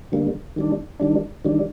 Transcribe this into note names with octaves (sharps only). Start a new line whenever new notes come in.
D3 G3 A#3
D#3 G3 D4
D#3 G3 D4
D#3 G3 D4